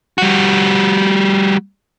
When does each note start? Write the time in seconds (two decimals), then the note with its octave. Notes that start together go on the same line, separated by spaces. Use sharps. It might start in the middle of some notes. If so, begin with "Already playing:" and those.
0.18 G3 F#4